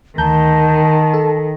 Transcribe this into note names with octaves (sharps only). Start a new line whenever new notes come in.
D2 D#3 A5 A#5 G6
A4